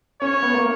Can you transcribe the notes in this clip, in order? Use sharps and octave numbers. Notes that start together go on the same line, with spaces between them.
C#4 C#5
B3
A#3